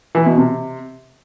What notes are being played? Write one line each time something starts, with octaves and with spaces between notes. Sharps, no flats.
E3
B2
C3